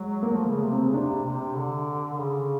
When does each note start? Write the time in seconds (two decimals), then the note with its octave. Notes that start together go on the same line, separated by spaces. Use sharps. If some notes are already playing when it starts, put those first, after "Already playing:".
Already playing: F#3 G#3
0.23 A#3
0.31 F3 A3
0.48 C#3
0.63 C3
0.73 C4
0.78 C#3
0.94 C3 D4
1.24 C3
1.56 D3
2.13 D3
2.18 C#3